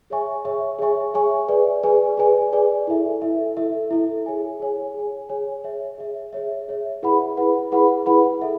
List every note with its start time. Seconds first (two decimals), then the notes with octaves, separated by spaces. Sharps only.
0.10 G#4 C#5 E5 G#5 C#6
0.44 G#4 C#5 E5 G#5 C#6
0.79 G#4 C#5 E5 G#5 C#6
1.14 G#4 C#5 E5 G#5 C#6
1.48 G#4 B4 D5 G#5
1.83 G#4 B4 D5 G#5
2.17 G#4 B4 D5 G#5
2.53 G#4 B4 D5 G#5
2.87 E4 A4 E5
3.22 E4 A4 E5
3.57 E4 A4 E5
3.91 E4 A4 E5
4.26 G#4 C#5 G#5
4.60 G#4 C#5 G#5
4.94 G#4 C#5 G#5
5.29 G#4 C#5 G#5
5.64 G#4 C#5 E5
5.98 G#4 C#5 E5
6.33 G#4 C#5 E5
6.68 G#4 C#5 E5
7.03 E4 G#4 B4 F#5 B5
7.37 E4 G#4 B4 F#5 B5
7.72 E4 G#4 B4 F#5 B5
8.06 E4 G#4 B4 F#5 B5
8.42 A4 E5